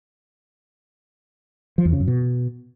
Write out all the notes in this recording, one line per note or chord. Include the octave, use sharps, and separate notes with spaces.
F3
E2
C#3
F#2
B2